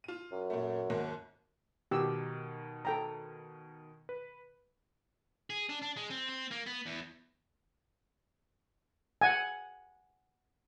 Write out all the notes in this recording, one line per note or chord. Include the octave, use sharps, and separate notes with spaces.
F4 D#7
F#2
A#2 A3
D#2 G#2 A#3
B2 D#3 G4 E6
A4 G5 A#5
B4
G#4
D4
D4
G#3
C4
C4
A#3
B3
E2
F#5 G#5